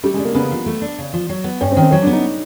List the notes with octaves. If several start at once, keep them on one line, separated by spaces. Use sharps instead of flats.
G3 A3
G#3
D4
A#3
C#3 B3
F3
A3
D4
C#3
F3
F#3
B3
G2 C#4
C4
D#3
C4
F#3 C#4
D4
B3
D#4